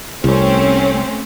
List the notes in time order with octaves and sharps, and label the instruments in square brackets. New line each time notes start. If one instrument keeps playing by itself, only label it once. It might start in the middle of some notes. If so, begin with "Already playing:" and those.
[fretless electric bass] C2 [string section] A3 C4 C#4